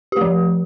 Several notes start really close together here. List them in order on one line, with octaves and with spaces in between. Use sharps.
G4 A3 F3